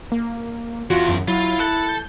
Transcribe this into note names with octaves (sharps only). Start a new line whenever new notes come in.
A#3
E2 F4 F#4
F#2
F#3 E4 F4
A4 A5 F#6
G6